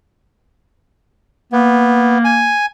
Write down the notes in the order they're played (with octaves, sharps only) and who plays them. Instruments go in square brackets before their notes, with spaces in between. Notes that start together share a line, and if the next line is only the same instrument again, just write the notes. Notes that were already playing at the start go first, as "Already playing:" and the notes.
[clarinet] A#3 [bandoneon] B3
[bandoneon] G#5